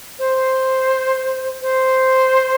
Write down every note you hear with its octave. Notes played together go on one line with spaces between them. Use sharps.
C5
C5